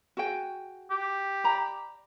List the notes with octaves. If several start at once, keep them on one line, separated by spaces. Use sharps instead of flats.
F#4 G#4 G5
G4
D5 A#5 B5